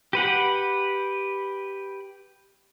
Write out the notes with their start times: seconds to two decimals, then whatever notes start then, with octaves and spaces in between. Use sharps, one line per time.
0.13 G4 B4 F#5